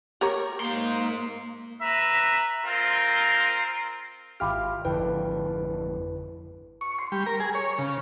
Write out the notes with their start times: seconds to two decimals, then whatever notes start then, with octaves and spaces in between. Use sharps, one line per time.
0.21 G4 A#4 C#5
0.60 G#2 A#3 C6
1.81 B4 E5 A#5
2.65 C4 F4 A#4
4.40 G#1 E4 F4 G4 F6
4.85 G#1 F2 D3 E4 B4 G5
6.81 C#6
6.99 C6
7.12 G3
7.26 A#4
7.40 G#4
7.55 C#5
7.78 C#3